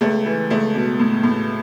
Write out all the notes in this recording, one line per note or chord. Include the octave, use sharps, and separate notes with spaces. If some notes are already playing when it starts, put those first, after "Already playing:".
C#2 A3
E3
C#2 A3
B2
A2
A2